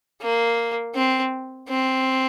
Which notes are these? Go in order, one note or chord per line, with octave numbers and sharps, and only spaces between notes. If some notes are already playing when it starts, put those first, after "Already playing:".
A#3
C4
C4